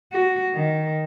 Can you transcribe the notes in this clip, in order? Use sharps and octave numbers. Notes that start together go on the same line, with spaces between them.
F#4
D#3